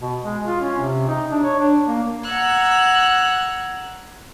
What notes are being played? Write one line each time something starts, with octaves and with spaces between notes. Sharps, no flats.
B2
G#3
F4
C#4
C3
D#4
D4
C#5
D4
A#3
F#5 A#5 E6 F#6 G#6